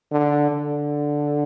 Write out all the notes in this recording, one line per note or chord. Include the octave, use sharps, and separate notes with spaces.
D3
D3